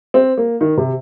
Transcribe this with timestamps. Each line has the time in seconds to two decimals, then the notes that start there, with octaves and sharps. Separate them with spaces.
0.14 C4
0.37 A#3
0.61 D#3
0.77 C3